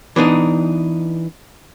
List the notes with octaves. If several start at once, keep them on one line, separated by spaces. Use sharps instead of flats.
E3 B3 D4 D#4